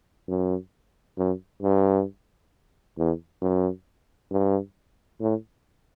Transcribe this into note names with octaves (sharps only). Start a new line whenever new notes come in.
F#2
F#2
G2
E2
F#2
G2
A2